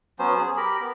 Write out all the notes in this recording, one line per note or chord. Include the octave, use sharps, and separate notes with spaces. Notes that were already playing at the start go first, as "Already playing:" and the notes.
F#3 B3 C#4 C5
G#4
G4 A#4 B5
B3